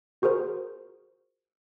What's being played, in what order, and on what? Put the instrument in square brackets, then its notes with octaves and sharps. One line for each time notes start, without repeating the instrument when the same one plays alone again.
[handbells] F4 F#4 G#4 A#4 C5